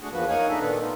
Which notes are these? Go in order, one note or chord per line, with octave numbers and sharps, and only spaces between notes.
A3 D4 F#4 G#4 F#5
E2 F3 A#3 F#4 B4
A#3 D#4 C#5 F5 F#5 G#5
D4 D#4 G#4 A4 D#5 E5
A#2 D#3 B3 D4 A4 B4
A3 B3 D#4 F4